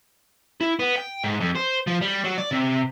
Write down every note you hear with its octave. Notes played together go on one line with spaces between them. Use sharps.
E4
B3
G5
G#2
F2
C5
F3
G3
F#3
D5
C3